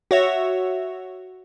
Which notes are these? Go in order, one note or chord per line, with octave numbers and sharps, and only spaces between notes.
F#4 C#5 E5